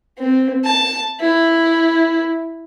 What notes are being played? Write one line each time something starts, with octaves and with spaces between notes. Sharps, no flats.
C4
A5
E4